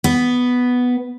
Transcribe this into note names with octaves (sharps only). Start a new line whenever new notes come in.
B3